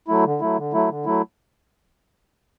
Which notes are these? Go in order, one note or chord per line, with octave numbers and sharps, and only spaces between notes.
F#3 A3 E4
D3
F#3 A3 E4
D3
F#3 A3 E4
D3
F#3 A3 E4